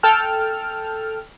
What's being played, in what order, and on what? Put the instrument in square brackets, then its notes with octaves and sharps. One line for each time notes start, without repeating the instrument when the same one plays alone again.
[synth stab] A4 G5 A5 F6